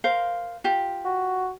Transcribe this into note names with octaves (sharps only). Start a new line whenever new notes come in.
A#4 C5 F5
F4 G4
F#4